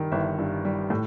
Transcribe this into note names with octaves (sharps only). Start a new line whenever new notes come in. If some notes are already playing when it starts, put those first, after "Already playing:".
Already playing: G2 D#3 G3
G1 E5
G2
G3
A2